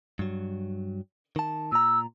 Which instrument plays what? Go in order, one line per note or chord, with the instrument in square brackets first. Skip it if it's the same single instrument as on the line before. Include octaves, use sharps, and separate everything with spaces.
[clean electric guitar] G2 F#3
D#3 A5
[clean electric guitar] A#2 A#5 [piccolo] E6